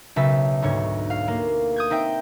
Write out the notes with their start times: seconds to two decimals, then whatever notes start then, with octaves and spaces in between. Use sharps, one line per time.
0.16 B1 C#3 E5 A5 B6
0.62 D2 G#2 C#5
1.10 F5
1.28 A#3
1.76 D#6 G6 G#6
1.90 C4 D#4 E5 G5